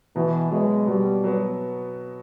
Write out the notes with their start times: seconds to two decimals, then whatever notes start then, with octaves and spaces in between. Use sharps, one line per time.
0.15 B2 E3
0.51 F#3 G#3 B3
0.87 B2 G3
1.24 F#3 B3